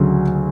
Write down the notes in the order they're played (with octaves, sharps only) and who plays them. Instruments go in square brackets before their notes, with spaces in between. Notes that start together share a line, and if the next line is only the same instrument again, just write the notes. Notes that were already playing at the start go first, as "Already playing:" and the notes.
Already playing: [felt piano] D2 C#3 F#3